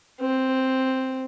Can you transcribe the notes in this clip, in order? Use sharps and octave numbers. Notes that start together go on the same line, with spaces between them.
C4